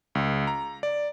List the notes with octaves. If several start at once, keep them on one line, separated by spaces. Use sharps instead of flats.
C#2
A#5
D5